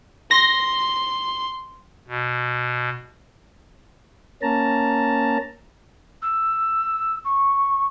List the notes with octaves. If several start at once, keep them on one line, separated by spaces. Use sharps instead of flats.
C6 A#6
B2
A#3 C#4 A5 A#5
E6
C#6